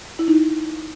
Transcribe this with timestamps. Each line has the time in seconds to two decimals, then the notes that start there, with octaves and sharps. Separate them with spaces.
0.19 E4
0.28 D#4